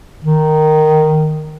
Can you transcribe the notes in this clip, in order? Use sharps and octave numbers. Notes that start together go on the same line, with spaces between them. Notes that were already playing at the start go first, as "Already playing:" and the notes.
D#3